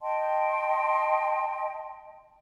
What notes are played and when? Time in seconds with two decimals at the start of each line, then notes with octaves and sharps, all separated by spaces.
0.01 D#5 G5 A5 C6